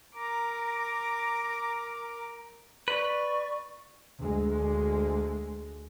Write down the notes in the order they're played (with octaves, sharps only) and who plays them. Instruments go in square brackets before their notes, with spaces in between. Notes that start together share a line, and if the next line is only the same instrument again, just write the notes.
[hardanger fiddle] A#4 D6 [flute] A#5
[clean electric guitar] B4 [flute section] D5 C#6
[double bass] D2 G#3